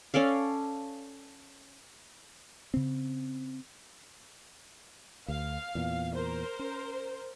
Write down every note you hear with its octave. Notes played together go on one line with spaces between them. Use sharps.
C#4 A4 D5 F5
C#3 C4
D2 F5
E2 A#2
A#4 C5
C#4